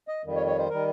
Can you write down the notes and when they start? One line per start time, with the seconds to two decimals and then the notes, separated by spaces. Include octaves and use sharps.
0.08 D#5
0.24 F2 D#3 G3
0.36 C#5
0.47 C#5
0.58 C5
0.70 D#3 G3 A#4